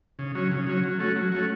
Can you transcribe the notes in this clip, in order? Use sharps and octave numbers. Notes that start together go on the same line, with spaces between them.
C#3
F#3 C#4
C#3
F#3 C#4
F#3
A3 C#4 F#4
F#3
A3 C#4 F#4